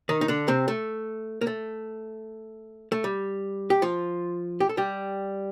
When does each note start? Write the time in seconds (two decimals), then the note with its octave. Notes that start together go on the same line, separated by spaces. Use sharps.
0.09 D#3 D#4
0.21 D#4
0.28 D3 D4
0.48 C3 C4
0.68 A3
1.41 A#3
1.47 A3
2.92 A3
3.04 G3
3.70 G4
3.82 F3 F4
4.60 G4
4.69 A4
4.77 G3 G4